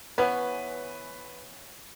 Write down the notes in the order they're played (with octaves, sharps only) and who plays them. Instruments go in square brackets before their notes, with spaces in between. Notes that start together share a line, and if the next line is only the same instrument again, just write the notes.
[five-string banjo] E3 B3 C#4 [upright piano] B4